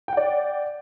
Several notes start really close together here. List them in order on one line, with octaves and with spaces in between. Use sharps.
G5 F#5 D5